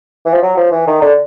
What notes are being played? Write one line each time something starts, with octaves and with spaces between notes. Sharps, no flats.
E3
F3
F#3
F3
E3
D#3
D3